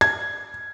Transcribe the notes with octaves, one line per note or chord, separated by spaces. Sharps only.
G#6